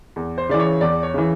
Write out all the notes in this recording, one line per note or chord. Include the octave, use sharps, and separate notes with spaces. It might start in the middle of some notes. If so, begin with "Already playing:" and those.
E2
C5
C#3 E3 D5
C#5
E2 D5
C#5
C#3 E3